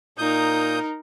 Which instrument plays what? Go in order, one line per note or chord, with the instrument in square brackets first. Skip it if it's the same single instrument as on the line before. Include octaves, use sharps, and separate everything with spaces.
[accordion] A#2 D#6 G6 [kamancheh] D#4 A#4